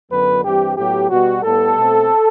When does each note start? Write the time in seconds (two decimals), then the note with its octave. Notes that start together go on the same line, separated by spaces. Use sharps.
0.10 F#2 D3 F#3 B3 B4
0.43 G2 E3 G3 C4 G4
0.77 A2 F#3 B3 G4
1.10 B2 G3 B3 F#4
1.43 A2 G3 B3 A4
1.76 B2 A3 C4